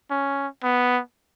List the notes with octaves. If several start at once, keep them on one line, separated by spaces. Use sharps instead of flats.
C#4
B3